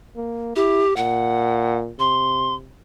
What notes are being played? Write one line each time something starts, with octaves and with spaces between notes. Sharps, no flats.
A#3
E4 G4
A#2 F#5
C3 C6